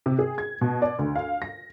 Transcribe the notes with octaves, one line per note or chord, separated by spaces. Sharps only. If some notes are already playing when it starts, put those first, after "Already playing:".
C3
G#4
G#6
B2
D5
D2
F5
A#6